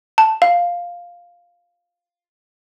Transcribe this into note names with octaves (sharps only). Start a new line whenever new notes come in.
A5
F5